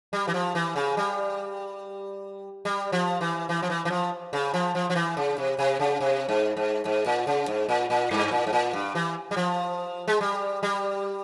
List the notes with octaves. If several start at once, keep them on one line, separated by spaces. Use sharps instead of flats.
G3
E3
F3
E3
C#3
G3
G3
F3
E3
E3
F3
E3
E3
F3
C#3
F3
F3
F3
E3
C#3
C3
C3
C#3
C3
G#2
G#2
G#2
A#2
C#3
G#2
A#2
A#2
G2
A#2
G#2
A#2
G2
E3
G3
F3
G#3
G3
G3